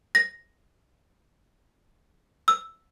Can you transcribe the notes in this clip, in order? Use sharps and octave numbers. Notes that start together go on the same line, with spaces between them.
A#6
E6